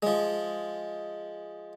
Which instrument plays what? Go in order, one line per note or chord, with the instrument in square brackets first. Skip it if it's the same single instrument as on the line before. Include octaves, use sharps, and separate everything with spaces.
[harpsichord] F3 G#3